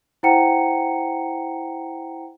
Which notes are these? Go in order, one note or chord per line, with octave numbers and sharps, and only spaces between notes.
E4 C5 F#5 G5 A#5 C#7